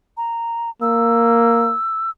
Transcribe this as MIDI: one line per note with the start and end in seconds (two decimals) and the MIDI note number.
0.17 0.70 82
0.82 1.75 58
0.82 2.10 88